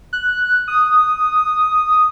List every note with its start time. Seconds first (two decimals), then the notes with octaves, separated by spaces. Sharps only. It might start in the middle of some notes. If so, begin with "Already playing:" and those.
0.13 F#6
0.68 D#6